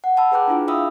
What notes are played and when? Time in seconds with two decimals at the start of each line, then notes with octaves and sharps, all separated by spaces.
0.04 F#5
0.17 F#5 A5 B5 E6
0.32 G#4 B4 G5 A#5 D6 F#6
0.48 D4 E4 F4 G#4
0.68 E5 F5 G5 B5 D#6 E6